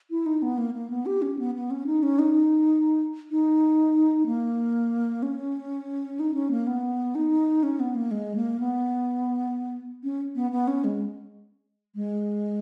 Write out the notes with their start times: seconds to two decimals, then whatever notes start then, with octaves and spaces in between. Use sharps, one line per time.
0.11 E4
0.26 D#4
0.42 B3
0.58 A#3
0.74 A#3
0.90 B3
1.06 G4
1.22 C#4
1.39 B3
1.55 B3
1.71 C#4
1.86 D#4
2.03 C#4
2.19 D#4
3.31 D#4
4.26 A#3
5.23 C#4
6.20 D#4
6.34 C#4
6.51 A#3
6.67 B3
7.15 D#4
7.63 C#4
7.80 B3
7.95 A#3
8.11 G#3
8.36 A#3
8.60 B3
10.04 C#4
10.35 B3
10.51 B3
10.68 C#4
10.84 G#3
11.95 G#3